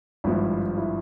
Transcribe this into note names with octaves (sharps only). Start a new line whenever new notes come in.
G#1 G2 F3 E4
E4